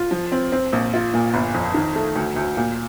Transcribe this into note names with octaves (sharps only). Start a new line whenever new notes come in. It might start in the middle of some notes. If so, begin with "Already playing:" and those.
Already playing: F4
F3
C4
C4
A#1
F4
A#2
G1
F2
D#3
A3
D2
D2
A#2